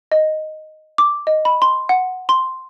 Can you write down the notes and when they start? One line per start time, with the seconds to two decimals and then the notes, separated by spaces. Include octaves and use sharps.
0.12 D#5
0.98 D6
1.27 D#5
1.45 B5
1.62 C6
1.89 F#5
2.29 C6